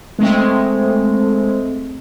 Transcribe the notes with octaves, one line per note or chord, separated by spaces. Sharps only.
G#3 A3 C4